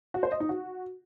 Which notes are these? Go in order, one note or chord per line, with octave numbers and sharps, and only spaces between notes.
F#4
C5
D#5
D#4
F#4